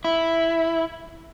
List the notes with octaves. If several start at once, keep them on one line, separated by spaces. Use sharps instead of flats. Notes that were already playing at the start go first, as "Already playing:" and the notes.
E4